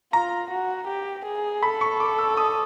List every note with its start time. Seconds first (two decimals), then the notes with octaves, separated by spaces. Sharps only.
0.13 F4 A#5
0.51 F#4
0.87 G4
1.25 G#4
1.62 A4 B5
1.81 C#6
2.00 D6
2.19 E6
2.37 D#6